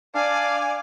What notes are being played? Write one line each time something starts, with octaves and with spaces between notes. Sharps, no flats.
D4 D5 F5 G#5